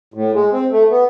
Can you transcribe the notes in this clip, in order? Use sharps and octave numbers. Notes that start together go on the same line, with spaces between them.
A2
G#3
C4
A3
B3